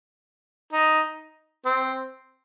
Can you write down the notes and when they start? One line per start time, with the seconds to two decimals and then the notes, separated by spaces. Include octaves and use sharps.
0.73 D#4
1.65 C4